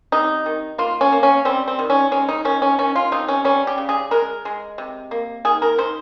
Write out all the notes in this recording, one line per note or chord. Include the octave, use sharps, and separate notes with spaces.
C3 D#4
D#3
A#3 F4
C#4
A#3
C#4
G3 C4
C4
D#3
C#4
G#3 C#4
D#4
D#3 C#4
C#4
D#3 C#4
F4
C3 D#4
C#4
G3 C#4
G4
C#3
G#4
G#3 A#4
G#3
C3
A#3
D#3 G#4
A#4
D#3 C5